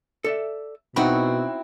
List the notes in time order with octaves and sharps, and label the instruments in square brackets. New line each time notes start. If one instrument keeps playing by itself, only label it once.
[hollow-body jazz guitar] A4 D5 E5
[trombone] B2 [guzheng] C4 E4 F#4 [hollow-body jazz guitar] D#4 B5